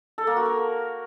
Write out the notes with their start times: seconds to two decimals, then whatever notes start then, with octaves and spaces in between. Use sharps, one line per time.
0.18 A4
0.27 A#3
0.36 F#4
0.46 A#4